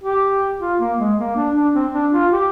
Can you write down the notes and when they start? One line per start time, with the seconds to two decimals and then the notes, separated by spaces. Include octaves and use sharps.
0.03 G4
0.60 F4
0.79 A#3
0.99 G#3
1.18 A#3
1.36 D4
1.55 D4
1.74 C4
1.93 D4
2.13 F4
2.31 G4